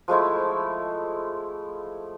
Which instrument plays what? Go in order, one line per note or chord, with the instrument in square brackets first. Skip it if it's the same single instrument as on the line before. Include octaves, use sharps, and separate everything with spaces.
[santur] F3 G#3 A3 E4